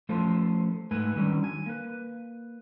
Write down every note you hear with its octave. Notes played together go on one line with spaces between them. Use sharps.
F3 A3 C#4 A4 C5
G#2 A3 B4 G#5
D3 D#3 F#3 G3 C#4
G#5
A#3 B4